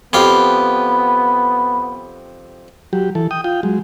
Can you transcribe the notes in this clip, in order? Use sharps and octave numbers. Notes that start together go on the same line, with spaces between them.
F2 B3 G4 F5 B5
F#3 G4
E3 A4
G5 D#6
F4 G5
F#3 G#3